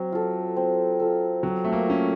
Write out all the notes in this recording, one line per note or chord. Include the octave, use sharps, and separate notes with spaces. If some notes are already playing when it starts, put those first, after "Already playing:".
Already playing: F#3 C4
F4 A4
C4
F4 A4
F#3 C4
A3
A#3
C#4 F4 A4